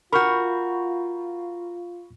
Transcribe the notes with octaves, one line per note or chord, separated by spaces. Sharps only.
F4 F#4 A#4 B5 C#6 G6